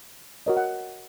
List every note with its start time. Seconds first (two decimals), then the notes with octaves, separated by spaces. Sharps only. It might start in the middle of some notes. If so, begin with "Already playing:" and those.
0.46 F#4 A#4 C#5 D#5
0.57 F#5